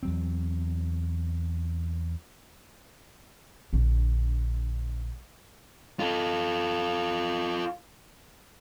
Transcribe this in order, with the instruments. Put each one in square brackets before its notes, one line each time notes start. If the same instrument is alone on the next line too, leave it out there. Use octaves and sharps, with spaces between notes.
[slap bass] E2 F#3 C4
[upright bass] A#1 D3
[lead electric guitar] F4 A4